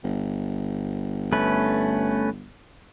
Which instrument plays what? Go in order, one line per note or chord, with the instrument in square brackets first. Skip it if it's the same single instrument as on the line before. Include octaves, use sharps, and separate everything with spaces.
[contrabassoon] G1
[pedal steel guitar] A3 C#4 B4